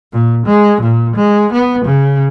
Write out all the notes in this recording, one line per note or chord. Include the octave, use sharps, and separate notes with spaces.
A#2
G#3
A#2
G#3
B3
C#3